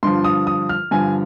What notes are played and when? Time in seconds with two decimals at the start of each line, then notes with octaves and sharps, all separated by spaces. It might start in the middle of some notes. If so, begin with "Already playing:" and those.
0.03 G2 D3 F3 C6
0.25 D#6
0.47 D#6
0.69 F6
0.91 G2 D3 F3 G#5